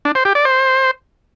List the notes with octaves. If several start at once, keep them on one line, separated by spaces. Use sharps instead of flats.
D4
C5
G4
D5
C5